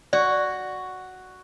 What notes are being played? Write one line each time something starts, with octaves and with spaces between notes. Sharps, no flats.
F#4 D5